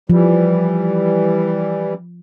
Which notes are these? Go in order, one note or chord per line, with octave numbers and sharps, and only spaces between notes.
E3 F3 G3